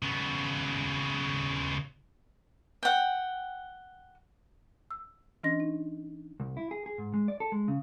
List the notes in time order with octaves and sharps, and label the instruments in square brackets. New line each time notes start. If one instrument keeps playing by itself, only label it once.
[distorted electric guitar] C#3 B3
[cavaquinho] F#5 G5
[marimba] E6
E3 C#4 D4 D#5 A#6
D#4
[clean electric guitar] C2
E4
G#4
G#4
G#2
G#3
D5
A4
G#3
C#3